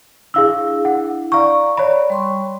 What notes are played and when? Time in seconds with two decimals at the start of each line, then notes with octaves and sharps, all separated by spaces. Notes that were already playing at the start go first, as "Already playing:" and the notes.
0.34 D4 E4 G#4 F5 E6
0.85 F#5
1.32 D5 F5 A#5 C#6
1.77 C#5 D5 B5
2.10 G3 C6 C#6